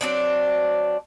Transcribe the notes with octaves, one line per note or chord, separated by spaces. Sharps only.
F#3 C4 D4